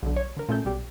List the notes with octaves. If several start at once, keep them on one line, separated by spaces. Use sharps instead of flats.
B1 D3
C#5
D3 A#4
A#2 A3 C#4 A4 G6
B1 G3 G4